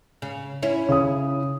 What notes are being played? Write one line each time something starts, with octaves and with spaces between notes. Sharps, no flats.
C#3
C#4 E4
C#3 D#6